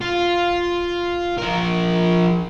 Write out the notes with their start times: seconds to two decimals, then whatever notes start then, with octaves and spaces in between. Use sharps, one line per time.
0.01 F4
1.38 F3 A#4